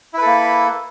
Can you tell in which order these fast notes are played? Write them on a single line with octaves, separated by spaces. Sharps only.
E4 B4 A4 A#3